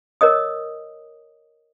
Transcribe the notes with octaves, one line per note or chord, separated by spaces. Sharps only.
A#4 C#5 D#5 D#6